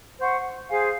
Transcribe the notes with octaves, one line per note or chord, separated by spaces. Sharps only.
C5 F#5 C#6
G#4 C5 F5 G#5